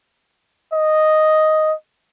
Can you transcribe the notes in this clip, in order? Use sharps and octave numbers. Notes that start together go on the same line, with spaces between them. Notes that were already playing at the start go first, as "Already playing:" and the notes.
D#5